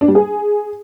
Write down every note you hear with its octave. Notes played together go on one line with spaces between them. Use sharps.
D4
G3
G#4